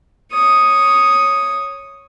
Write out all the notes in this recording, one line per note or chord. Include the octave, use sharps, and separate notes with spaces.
C#5 D#6